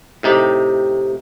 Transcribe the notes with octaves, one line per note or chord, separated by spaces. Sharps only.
A2 C3 D#4 G4